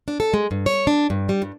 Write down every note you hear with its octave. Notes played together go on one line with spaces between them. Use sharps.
D4
A4
G#3
G2
C#5
D4
G2
G3
G2